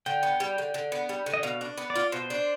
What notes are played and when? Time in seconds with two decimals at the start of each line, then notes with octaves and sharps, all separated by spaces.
0.06 D3 G5
0.23 B3
0.40 G3
0.58 D3
0.74 D3
0.92 B3
1.09 G3
1.26 D3
1.34 D#5
1.43 B2 F5
1.61 D4
1.78 B3
1.90 D5
1.96 F4
2.12 B2 C5
2.30 D4